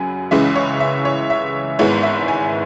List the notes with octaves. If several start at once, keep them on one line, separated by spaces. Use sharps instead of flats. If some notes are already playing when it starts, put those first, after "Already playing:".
Already playing: F#2 C#3 F#3 G#5 B5
C#2 C#3 E3 G#3 C#4 E5
C#5
E5
C#5
E5
G#1 G#2 G#3 B3 E4 C#5
E5
G#5